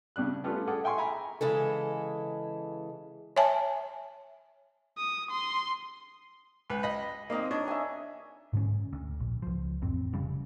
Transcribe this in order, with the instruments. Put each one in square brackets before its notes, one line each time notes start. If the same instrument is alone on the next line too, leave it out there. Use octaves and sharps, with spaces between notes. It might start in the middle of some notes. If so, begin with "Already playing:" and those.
[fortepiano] C#3 G3 D4 F#6
G3 A3 B3 C#4 F4 G4
G#4 A4 F#5 D6
E5 G5 G#5 C6 C#6
E5 G#5 A#5 B5
[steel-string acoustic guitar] C#3 E3 G#3 A4
[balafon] C#5 E5 G#5 A5
[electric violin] D#6
C6
[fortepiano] C#2 B4
D#5 B5
[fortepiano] A#3 C4 [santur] D#4 D#5
[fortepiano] D4 [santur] C#5
[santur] E5 G#5
[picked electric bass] G#2 D3 C#4
D2
A#1
C#2 F3
A1 F2 C4
F1 C#3 G3